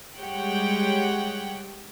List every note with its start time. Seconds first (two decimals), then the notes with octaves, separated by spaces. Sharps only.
0.19 G3 G#3 G4 C#5 F#5 G5